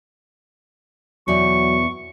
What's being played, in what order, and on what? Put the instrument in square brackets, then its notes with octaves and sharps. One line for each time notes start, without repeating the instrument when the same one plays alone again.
[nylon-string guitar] E2 B2 D5 [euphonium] F#3 [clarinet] C#6